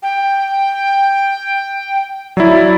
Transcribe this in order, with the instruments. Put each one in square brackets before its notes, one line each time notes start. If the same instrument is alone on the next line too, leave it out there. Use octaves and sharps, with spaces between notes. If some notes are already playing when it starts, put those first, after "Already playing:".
[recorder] G5
[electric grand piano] F#3 E4 [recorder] D5